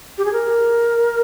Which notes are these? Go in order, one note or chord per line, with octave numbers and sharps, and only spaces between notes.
G4
G#4
A#4